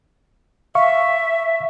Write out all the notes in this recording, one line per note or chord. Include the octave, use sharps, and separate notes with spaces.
E5 F5 C#6